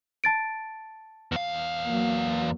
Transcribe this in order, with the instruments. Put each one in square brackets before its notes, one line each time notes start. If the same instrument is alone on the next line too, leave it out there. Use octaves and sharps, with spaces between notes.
[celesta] A5 A6 D7
[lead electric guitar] E2 F5
[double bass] F#3 A#3